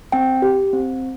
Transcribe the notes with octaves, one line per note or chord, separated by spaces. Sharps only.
C4 G5
G4
C4